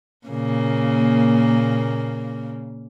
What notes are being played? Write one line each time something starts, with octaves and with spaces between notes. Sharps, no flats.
A#2 C#3 A#3